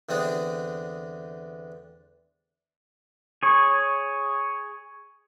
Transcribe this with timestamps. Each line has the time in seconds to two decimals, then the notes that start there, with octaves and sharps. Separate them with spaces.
0.09 E2 D3 C4 D4 D#6
3.43 G#4 C#5